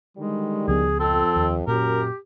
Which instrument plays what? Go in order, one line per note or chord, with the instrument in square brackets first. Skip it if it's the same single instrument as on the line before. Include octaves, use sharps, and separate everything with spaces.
[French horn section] D3 D#3 G3 [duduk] G#3
[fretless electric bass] C#2 F3 B3 [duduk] G#4
[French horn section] F2 [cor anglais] C4 [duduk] A4
[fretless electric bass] D#2
[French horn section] F#2 [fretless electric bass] A#2 [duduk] G4 [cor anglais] A#4